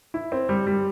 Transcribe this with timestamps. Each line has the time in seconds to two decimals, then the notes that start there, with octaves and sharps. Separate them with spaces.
0.14 E4
0.32 C4
0.49 G3
0.67 G3